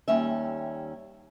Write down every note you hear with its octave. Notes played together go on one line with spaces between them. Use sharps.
D#2 G3 C#4 E5